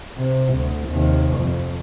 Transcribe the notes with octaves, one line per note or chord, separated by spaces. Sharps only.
C3
D2
D#2 C3
F2